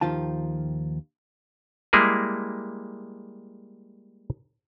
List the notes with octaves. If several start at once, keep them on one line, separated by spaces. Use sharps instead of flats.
D#2 D#3 F3 F4 A5
G3 G#3 A#3 E4 G#4